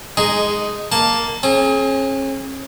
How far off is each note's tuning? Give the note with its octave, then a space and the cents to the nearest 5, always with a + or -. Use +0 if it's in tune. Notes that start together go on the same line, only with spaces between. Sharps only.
G#3 +0 D#4 -10 G#4 +0
A#3 +0 A5 +0
C#4 -40 G#4 +30